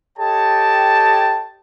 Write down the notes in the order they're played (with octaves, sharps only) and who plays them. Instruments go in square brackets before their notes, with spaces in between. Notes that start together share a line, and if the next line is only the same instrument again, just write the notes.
[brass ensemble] G4 A4 C#5 D#5 G5 A5